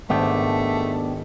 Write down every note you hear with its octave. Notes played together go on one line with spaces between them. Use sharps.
G#1 A3 B3 D4 G4